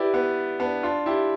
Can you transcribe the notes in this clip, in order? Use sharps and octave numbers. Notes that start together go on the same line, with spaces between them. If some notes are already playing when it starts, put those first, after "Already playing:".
Already playing: E4 G4 B4 D5
B3
B3 D4
D4 F4
E4 G4